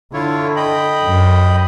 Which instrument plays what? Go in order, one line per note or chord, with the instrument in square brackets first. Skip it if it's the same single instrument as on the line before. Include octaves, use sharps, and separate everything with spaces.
[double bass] D3 [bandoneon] E4 F4 C#5
[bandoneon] D#5 G5 B5
[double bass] F#2